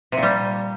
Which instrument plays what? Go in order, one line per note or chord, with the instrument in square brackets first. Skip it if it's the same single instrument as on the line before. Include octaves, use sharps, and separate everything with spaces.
[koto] C3
A#2
G3